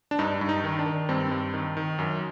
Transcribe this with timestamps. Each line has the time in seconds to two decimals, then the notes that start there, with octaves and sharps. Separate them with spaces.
0.11 D4
0.19 G2 D#4
0.41 G2
0.49 D#4
0.64 D#3
0.79 D4
0.86 D#3
1.09 G2 C4
1.31 G2
1.54 D#3
1.77 D#3
1.99 F#2